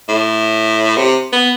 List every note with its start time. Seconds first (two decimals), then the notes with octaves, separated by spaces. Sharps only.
0.09 A2
0.97 C3
1.33 B3